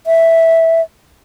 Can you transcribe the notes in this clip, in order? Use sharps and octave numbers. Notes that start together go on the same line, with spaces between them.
E5